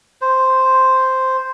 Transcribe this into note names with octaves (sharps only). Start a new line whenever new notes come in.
C5